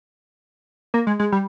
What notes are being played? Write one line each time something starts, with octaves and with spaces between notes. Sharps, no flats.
A#3
G#3
G#3
G3